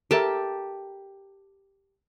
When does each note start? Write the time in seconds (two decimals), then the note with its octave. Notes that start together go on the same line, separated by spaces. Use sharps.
0.11 G4 A4 A#4 E5 A5